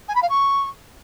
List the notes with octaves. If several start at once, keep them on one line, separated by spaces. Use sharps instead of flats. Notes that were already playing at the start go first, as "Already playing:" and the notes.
G#5
B5
F5
C#6